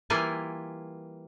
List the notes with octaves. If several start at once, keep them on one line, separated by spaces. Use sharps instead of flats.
E3 G3 A#3 E4 F4 G#5